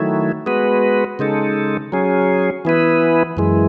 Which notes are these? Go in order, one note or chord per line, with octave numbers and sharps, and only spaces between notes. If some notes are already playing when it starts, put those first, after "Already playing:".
Already playing: D#3 F#3 A3 E4
G#3 B3 F#4 B4
C#3 G#3 D#4 A4
F#3 C#4 G#4
E3 B3 E4 B4
F#2 E3 G#3